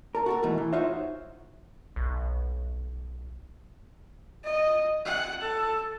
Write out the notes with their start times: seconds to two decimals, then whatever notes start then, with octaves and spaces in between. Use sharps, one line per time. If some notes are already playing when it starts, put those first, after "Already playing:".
0.15 A4 A#4
0.26 F#4 A4 A#4
0.43 G#2 B2 D#3 E3 A3 D#4
0.58 E3
0.73 D#4 F4 F#4 C5 C#5 E5
1.96 B1
4.44 D#5
5.05 F#5
5.42 A4